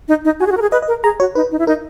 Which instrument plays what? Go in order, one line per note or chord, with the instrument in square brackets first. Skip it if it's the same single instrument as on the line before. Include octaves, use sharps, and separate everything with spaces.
[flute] D#4
D#4
[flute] F#4 [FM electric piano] G#5
[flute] G#4
F#4
A#4
G#4
[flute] B4 [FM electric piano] D#5
[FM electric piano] D#5
[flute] A#4
[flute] G#4 [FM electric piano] A#5
[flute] F#4 [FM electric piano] C#5
[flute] D#4 [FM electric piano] B4
[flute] D#4
E4
[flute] D#4 [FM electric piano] A#4